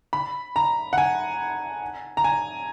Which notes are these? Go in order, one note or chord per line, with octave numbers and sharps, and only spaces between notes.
B5
A#5
F#5
G#5
A#5
G#5